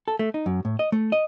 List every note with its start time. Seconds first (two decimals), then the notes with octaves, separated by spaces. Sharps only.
0.08 A4
0.19 A3
0.34 D#4
0.46 F#2
0.65 A2
0.79 D#5
0.92 A3
1.12 D#5